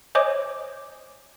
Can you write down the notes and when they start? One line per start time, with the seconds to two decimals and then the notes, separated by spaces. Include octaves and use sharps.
0.15 C5 C#5 D#5 G#5 D6